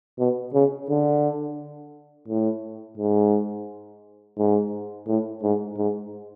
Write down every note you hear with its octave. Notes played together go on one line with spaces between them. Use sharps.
B2
C#3
D3
A2
G#2
G#2
A2
G#2
G#2